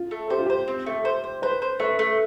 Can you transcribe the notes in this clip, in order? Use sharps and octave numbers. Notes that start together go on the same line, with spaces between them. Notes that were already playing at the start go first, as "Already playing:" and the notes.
Already playing: F4
A3
G4 C5
F4
G4 C5
C4
A3
C5
C5
B4 C5
C5
A3 B4
A3